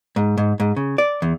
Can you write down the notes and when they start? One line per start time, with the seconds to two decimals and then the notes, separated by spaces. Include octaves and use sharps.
0.16 G#2
0.38 G#2
0.60 G#2
0.76 C#3
0.98 D5
1.22 E2